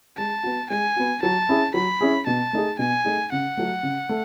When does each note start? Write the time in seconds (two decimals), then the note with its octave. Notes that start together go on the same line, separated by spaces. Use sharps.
0.17 G#3 A5
0.43 B3 F#4
0.70 G#3 G#5
0.96 B3 F#4
1.23 F#3 A5
1.49 C#4 E4 G#4
1.74 F#3 B5
2.01 C#4 E4 G#4
2.26 B2 A5
2.53 A3 D#4 G#4
2.79 B2 G#5
3.05 A3 D#4 G#4
3.32 C#3 F#5
3.57 F#3 A3
3.83 C#3
4.09 A3